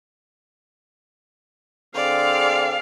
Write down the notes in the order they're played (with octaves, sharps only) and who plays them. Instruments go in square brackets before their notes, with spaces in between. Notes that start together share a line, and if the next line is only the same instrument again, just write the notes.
[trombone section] D3 C4 G#4 [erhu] D5 [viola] F5